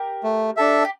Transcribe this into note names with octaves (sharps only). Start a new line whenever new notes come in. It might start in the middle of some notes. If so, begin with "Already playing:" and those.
Already playing: G4 A#4
A3
D4 A4 E5
G4